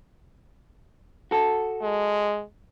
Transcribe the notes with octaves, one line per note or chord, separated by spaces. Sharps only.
F#4 A4
G#3